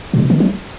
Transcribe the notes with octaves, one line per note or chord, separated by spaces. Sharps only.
A#2
B2
D#3
F#3